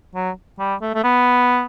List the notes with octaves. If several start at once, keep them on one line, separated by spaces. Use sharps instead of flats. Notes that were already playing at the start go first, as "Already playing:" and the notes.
F#3
G3
A3
A3
B3